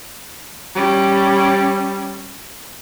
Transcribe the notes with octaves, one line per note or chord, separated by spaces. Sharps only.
G3 C#4